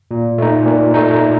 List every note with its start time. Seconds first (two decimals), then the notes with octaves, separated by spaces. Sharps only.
0.11 A#2
0.38 A3 D#4
0.66 A#2
0.94 A3 D#4